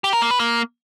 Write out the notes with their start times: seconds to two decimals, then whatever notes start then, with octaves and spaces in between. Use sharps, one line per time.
0.04 G4
0.13 A#4
0.22 A#3
0.31 B4
0.39 A#3